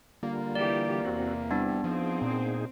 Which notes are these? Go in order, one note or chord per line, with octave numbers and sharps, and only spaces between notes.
D3 G3 A#3 F4
E3 G4 D5
E2 C3 C4 F#4
G3 B3 C4 D4 E4
F3 C4 D#4 G#4
A#2